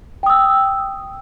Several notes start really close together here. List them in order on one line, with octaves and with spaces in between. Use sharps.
G5 D#6 E6